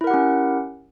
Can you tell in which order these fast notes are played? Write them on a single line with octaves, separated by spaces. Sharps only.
E4 A#4 F#5 G4 C#4